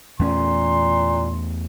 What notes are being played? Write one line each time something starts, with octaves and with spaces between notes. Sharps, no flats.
E2 A#2 A3 C#4 C6